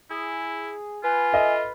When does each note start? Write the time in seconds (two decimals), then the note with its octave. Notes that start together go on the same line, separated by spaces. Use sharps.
0.10 E4 G#4
1.04 F4 B4 G#5
1.33 A4 D#5 E5